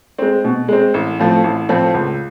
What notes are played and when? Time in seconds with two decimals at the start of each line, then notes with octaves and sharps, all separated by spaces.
0.18 G#3 C4
0.44 B2
0.68 G#3 C4
0.94 A1
1.19 A2 F3 A3 C4
1.44 A1
1.69 A2 F3 A3 C4
1.94 C#2